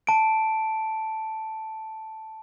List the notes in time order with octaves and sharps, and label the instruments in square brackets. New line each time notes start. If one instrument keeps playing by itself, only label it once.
[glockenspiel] A5 D7